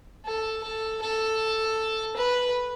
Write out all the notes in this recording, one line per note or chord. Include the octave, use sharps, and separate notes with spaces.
A4
A4
A4
B4